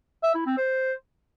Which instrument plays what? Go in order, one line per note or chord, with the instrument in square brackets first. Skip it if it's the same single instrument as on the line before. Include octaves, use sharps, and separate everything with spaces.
[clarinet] E5
E4
C4
C5